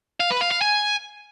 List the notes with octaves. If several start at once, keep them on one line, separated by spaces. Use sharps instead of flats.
F5
B4
F5
F5
G#5